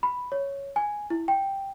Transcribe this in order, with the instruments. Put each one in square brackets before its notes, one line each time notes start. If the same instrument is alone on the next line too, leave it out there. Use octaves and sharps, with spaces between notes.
[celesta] B5
C#5
G#5
E4
G5